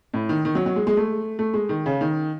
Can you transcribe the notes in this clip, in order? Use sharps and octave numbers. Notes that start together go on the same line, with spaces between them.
A2
D#3
D#3
F#3
F#3
G#3
G#3
A3
A3
G#3
D#3
C#3
D#3